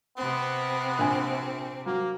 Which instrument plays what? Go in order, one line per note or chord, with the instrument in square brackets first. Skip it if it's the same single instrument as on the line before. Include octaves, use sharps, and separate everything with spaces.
[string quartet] C3 C4 [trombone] B3
[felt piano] A#1 G#5
[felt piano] F#3 [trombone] A#3